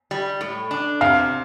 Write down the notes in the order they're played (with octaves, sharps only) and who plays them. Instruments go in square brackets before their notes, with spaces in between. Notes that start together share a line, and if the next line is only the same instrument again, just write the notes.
[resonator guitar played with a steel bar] G3
A2
D4
[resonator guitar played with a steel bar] C3 [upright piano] F5